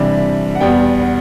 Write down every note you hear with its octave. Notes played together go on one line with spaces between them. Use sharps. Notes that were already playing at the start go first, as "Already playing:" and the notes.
Already playing: C3 E3 G3 D4
F#5
E2 B2 G3 B3 G5
F#5